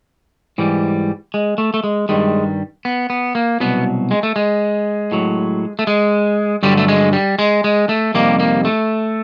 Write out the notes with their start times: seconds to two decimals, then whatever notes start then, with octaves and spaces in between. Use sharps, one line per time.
0.58 G#2 E3 G3
1.34 G#3
1.58 A3
1.74 A3
1.84 G#3
2.09 G2 D#3 G3 G#3
2.85 B3
3.10 B3
3.35 A#3
3.60 C2 B2 F#3 B3
4.11 G#3
4.23 A3
4.36 G#3
5.12 A2 F#3
5.79 A3
5.87 G#3
6.63 G2 D3 F#3 G3
6.77 A3
6.88 G#3
7.13 G3
7.39 G#3
7.64 G#3
7.89 A3
8.14 F2 C3 D#3 G3 A#3
8.39 A#3
8.65 A3